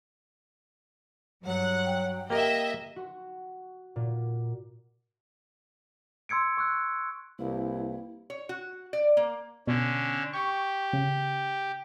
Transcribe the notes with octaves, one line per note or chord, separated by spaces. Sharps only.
G2 F#3 F#5
G5
A#3 G4 A#4 D#5 E5
F#4
A#2
C6 E6 G#6 C#7 D7
C#6 E6 F#6
C2 A#3 E4 B4 F5
C#5
F#4
D5
A#3
B2 D3 C#4
G4 C#6
C#3